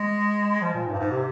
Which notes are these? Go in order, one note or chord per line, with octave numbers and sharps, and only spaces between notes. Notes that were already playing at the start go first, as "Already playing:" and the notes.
Already playing: G#3
F3
A#2
G#2
G2
G#2
C3